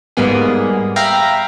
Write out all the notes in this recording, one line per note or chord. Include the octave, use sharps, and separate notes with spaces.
G#2 G3 A#3 B3 G#4
E5 F5 G5 A#5 B5 A#6